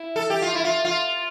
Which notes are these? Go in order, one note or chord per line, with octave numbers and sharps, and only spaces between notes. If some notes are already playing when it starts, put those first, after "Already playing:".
Already playing: E4
A4
G4
F4
E4
F4
F4